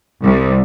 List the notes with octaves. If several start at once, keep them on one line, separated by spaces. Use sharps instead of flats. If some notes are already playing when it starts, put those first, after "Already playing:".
C2